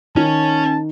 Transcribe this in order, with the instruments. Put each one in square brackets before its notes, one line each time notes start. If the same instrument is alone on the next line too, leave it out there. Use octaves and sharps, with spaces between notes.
[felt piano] D#3 [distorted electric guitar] C#4 G#5 [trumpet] A5